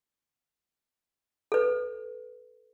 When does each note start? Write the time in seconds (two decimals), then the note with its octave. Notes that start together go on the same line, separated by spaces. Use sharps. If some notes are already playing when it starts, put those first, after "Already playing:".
1.52 A4 B4